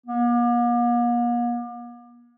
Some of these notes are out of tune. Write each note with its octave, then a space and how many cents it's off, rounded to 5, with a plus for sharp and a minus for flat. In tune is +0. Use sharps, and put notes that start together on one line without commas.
A#3 +45